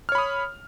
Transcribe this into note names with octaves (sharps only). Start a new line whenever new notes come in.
C#5 B5 D#6 F6